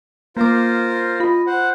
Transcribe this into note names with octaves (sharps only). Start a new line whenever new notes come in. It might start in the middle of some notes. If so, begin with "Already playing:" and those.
A#3 F4 A#4 C5 D6
F4 D#5 B5
C5 F#5